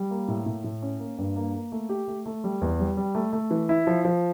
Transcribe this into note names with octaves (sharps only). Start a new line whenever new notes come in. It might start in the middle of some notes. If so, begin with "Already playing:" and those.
Already playing: G3
A#3
A2
A2
A2
C#4
A#3
G2
A#3
A#3
A3
G4
A3
A3
G3
E2
G3
G3
A3
A3
E3
E4
F3
F3